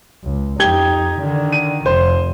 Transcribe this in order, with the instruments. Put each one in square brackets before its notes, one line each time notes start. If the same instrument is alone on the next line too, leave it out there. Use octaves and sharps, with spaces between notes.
[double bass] C#2
[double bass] F2 D#4 [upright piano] G4 G#6 G7
[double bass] D3 D#3
[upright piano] D#7
[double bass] F1 [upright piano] C5